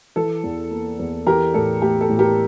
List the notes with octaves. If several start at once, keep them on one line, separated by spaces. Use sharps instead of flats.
E3 A4
E2
A#3
E2
E3 G4 A#4
A2 A4
A3 G4
A4
A2
G4 A#4